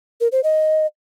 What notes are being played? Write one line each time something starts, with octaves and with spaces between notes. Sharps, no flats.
A#4
C5
D#5